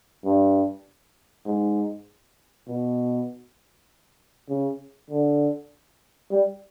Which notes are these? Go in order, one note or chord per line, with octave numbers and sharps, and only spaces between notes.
G2
G#2
B2
C#3
D3
G3